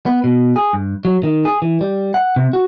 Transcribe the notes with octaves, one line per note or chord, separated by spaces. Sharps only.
B3
B2
G#4
G2
F#3
D#3
G#4
E3
G3
F#5
C3
F#4